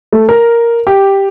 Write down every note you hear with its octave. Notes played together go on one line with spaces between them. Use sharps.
A3
A#4
G4